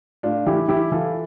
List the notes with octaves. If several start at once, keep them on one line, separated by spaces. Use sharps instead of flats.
A2 D4 F4
E3 E4 G4
E3 E4 G4
E3 F4 A4